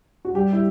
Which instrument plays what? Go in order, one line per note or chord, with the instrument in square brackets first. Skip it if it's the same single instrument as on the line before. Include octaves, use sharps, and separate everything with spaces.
[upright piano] F#4
[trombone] G3 [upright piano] G4
[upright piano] E4